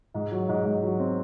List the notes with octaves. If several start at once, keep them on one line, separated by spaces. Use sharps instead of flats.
G#2
F#3
G#2
G#2
F#3
C4